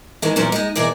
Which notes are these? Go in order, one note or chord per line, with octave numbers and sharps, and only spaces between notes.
D#3 E3 G#3
E2 A#2 F#3 A#3 C#4
G#3 D#4 D#5
B2 E3 A#3 G#4 D5